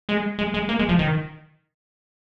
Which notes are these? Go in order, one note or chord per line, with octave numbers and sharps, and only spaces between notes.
G#3
G#3
G#3
A#3
G#3
F3
D#3